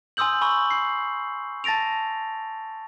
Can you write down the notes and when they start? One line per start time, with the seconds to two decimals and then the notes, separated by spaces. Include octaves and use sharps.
0.17 G#5 C6 D#6 E6 G6 F#7
0.41 G#5 B5 C#6 E6 F#7
0.71 C7
1.64 A5 A6 A#6 D7 F7